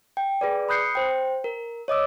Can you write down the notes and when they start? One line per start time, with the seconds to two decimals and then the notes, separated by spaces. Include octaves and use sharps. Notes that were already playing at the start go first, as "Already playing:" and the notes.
0.17 G5
0.41 G#4 B4 D5
0.69 B5 D#6 F#6 G6 C7 C#7
0.95 C5 G5
1.44 A#4
1.88 C#5 D#5 D6 E6